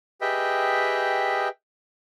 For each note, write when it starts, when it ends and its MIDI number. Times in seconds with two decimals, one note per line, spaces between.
0.21 1.48 67
0.21 1.48 68
0.21 1.48 71
0.21 1.48 75
0.21 1.48 76
0.21 1.48 79